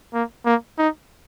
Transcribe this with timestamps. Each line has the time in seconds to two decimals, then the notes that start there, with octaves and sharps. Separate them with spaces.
0.13 A#3
0.45 A#3
0.78 D#4